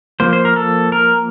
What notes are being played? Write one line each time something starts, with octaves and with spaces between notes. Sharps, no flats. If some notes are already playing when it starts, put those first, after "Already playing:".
F3 A#3 C5
C5
A#4
A4
A#4